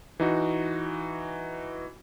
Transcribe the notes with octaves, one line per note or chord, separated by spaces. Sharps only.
E3 D#4 F#4